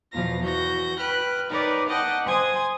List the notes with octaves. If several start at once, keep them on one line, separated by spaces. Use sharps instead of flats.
E2 B2 F3 F5 A#6
E3 F#4 G6 A#6
B4 G5 F6 F#6
D#4 A#4 B4 C#5 D5
D#5 F#5 G5 A5 D6
C5 G#5 C6 D#6 G#6